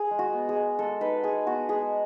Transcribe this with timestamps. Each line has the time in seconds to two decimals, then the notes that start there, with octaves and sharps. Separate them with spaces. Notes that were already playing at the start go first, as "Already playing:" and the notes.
Already playing: G#4
0.11 G#3
0.19 F#4
0.33 B3
0.49 G#4
0.56 G#3
0.79 G#3 A4
1.01 D#4 B4
1.23 G#3 G#4
1.46 B3 F#4
1.69 G#3 G#4